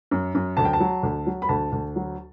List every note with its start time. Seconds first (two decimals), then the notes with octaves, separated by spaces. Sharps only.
0.11 F#2
0.35 F#2
0.57 D2 A5
0.65 G5
0.73 A5
0.80 F#3
1.03 D2
1.27 F#3
1.42 B5
1.49 D2 A5
1.72 D2
1.96 F#3